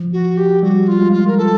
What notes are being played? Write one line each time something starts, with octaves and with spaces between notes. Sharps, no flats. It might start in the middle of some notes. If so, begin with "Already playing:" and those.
Already playing: F3
F#4
G4
G3 F#4
F4
G#3
F4
A#4
A4